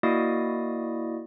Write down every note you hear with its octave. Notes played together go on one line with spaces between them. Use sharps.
A#3 E4 F#4 D5 D#5 D#6